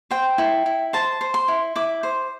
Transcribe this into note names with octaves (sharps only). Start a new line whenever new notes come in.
C5 G5
E4
E4
C5 A5
C5
C6
E4
E4 D6
C5